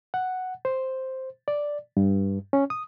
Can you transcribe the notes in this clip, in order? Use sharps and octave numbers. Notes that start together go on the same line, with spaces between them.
F#5
C5
D5
G2
C#4
D#6